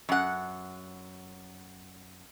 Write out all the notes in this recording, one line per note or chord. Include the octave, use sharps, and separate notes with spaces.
F#2 F#5